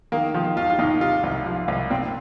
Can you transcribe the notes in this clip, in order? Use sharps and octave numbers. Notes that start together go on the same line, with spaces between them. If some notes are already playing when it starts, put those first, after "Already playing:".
D#3 A#3
D#3 F3
D#2 F4
F4
D#2 D#4
C3 F4
C2
F3
C2
A#2 C4